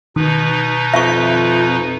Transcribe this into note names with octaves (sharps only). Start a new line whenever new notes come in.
B2 D#3 D#4 B4
F2 E5 A5 C#6